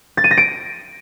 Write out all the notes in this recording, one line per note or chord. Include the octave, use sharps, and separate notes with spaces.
A6
D#7
A#6
D7